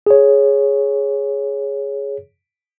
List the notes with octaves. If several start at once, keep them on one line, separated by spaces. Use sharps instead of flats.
G#4 C#5